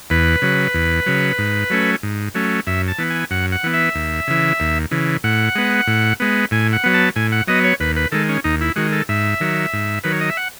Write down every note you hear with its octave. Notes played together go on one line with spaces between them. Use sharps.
E2 B4
C#3 F#3
E2
C#3 F#3
G#2
F#3 A3 C#4
G#2
F#3 A3 C#4
F#2 E5
A5
E3 B3
G#5
F#2 F#5
F#5
E3 B3
E5
D#2
C#3 E3
D#2
C#3 E3
A2 F#5
G#3 B3
A2
G#3 B3
A2 G#5
F#5
F#3 B3
A5
A2 G#5
F#5
F#3 B3 D#5
C#5
D#2 B4
B4
D#3 G#3 A4
C#4
D#2 D#4
E4
D#3 G#3 F#4
A4
G#2 E5
D#3 F#3
G#2
D#3 F#3 B4
C#5
D#5
E5
F#5